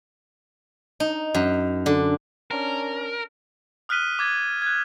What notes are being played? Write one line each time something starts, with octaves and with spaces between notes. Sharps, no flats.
D#4
F#2
D3
C#4 D4 A#4
D#6 F6 F#6 B6 D#7 G7
D6 G#6 A6
F#6 G#6